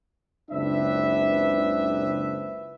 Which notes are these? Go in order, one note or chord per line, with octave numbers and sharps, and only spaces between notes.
F#1 C#2 C4 D4 B4 E5